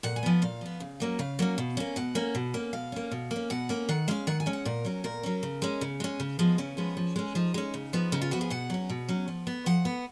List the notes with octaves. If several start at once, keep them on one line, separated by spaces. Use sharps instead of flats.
A#2 F#5
G#5
F3 B3
A#2 F5
F3 B3
C#3
F#3 A#3 C#4
C#3 F5
F#3 A#3 C#4
B2
A#3 C#4
B2 F#5
A#3 C#4
B2
A#3 C#4
B2 F5
A#3 C#4
B2
A#3
C#4
B2 F#5
A#3 C#4
D#3 F#5
G#3 C#4 F5
D#3 F#5
G#5
G#3 C#4
F#5
A#2 A#4
F#3 C#4
A#2 A#4
F#3 C#4
C#3
G#3 C#4
C#3
G#3 C#4
C#3
F3 G#3 B3
C#3 C#4
F3 G#3 B3
F3
G#3 C#4
F3 D#4
G#3 C#4
C#3
F3 B3
C#3 D#4
F4
F3 B3 F#4
G#4
B2 F#5
F#3 C#4
B2
F#3 C#4
F3
B3
F3 F#5
B3